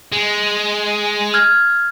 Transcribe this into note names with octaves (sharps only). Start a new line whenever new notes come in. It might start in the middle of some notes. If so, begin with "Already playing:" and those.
G#3
F6 G#6